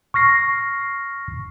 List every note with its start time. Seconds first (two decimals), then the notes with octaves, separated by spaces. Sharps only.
0.14 C#6 F6 A#6 C7